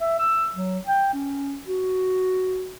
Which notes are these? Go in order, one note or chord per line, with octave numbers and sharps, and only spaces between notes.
E5
E6
F#3
G5
C#4
F#4